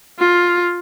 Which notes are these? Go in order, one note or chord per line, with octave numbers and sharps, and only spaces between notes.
F4